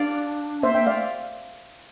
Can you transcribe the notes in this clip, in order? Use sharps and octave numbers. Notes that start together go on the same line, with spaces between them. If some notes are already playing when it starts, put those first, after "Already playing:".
Already playing: D4 D5 F5
A#3 C5 E5
A#3 E5 G5
A3 D5 F5